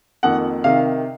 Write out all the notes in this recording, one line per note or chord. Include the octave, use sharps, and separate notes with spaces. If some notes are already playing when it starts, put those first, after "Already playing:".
F2 D#3 A#3 F#5
C3 D#3 F5